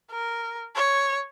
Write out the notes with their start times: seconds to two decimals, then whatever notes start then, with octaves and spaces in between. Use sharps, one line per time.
0.11 A#4
0.76 C#5